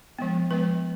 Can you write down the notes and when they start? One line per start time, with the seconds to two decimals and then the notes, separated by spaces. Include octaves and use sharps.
0.19 F3 G#3 B3
0.51 F3 G#3 B3 B4